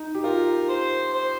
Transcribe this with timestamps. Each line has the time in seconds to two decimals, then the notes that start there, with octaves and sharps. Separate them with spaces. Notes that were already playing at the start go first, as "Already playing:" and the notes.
Already playing: D#4
0.15 G4
0.24 F4 A#4
0.69 C5
1.14 C5